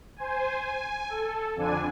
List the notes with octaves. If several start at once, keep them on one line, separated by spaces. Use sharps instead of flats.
C5 G#5
G#5
A4
F2 D3 D4 G#5